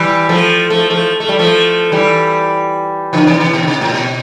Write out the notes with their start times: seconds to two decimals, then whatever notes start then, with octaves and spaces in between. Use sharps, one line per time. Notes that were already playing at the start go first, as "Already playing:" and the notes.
Already playing: E3 G3
0.29 F3 A3
0.70 F3 A3
0.90 F3 A3
1.20 A3
1.29 G3
1.39 F3 A3
1.92 E3 G3
3.13 D3 F3
3.27 C3 E3
3.40 C3 E3
3.53 B2
3.63 D3
3.67 C3
3.81 A2
3.94 B2